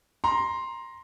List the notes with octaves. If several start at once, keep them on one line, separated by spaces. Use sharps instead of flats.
A#5 C6